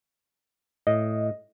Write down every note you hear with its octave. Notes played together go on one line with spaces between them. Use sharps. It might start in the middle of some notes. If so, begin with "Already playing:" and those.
A2 D#5